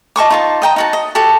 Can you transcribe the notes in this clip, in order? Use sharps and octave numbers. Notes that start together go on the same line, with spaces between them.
D#5 A5 C#6 D6
D#4 F4 A5
D#5 G5 A#5
D#4 F#4 A5
D#5
F#4 G4 A4 A5